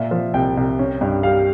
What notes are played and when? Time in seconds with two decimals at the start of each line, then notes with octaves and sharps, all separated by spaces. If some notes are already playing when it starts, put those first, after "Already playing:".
Already playing: A#2 E5
0.11 F3
0.34 C2 G5
0.57 C2
0.79 C#4
1.01 G2
1.23 G3 F5